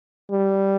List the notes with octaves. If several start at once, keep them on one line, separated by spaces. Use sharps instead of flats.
G3